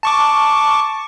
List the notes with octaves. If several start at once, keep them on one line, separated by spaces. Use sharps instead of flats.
A5 C#6 D6